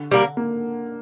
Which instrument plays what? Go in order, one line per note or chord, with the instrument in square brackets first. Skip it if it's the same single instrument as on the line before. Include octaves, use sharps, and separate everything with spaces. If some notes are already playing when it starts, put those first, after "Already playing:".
Already playing: [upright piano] D3
[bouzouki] G3 A#3
[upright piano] A#3